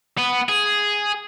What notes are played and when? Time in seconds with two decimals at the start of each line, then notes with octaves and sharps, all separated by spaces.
0.18 B3
0.49 G#4